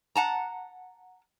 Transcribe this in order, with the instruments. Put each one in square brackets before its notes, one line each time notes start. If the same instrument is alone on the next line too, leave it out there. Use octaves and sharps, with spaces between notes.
[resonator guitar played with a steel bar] F#5 A5 A#5